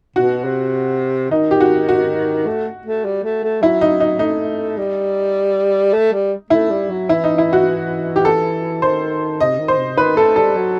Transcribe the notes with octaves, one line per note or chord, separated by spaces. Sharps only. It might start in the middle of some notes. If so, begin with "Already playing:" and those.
B2 F#4
C3
D#3 D#4
G4
F#4
F#4
A3
A3
G3
A3
A3
F#3 E4
D#4
D#4
A3 D#4
G3
A3
G3
A3 E4
G3
F#3
E3 E4
D#4
E4
F#4
G4
A4
D#3 C5
C3 D#5
D#3
C5
C3
D#3 B4
A3 A4
G3 A4
F#3